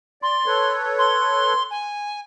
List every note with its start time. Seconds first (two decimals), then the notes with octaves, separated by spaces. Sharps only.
0.22 D5 C6
0.46 A4 B4 C#5
0.98 C6
1.70 G#5